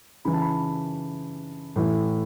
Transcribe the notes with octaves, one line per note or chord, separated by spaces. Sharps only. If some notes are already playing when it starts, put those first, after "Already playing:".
C#3 E3 B5
A5
B5
A2 E3